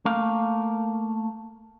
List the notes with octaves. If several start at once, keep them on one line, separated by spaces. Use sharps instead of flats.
A3 A#3 A#4 F5